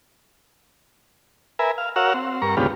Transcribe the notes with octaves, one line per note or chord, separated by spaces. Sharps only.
A#4 B4 E5 G#5
F5
F#4 A#4 C#5 F5 F#5 E6
C4
G2 A#4 A#5 C#6
D2 G#2 C#3 B3 F4 G4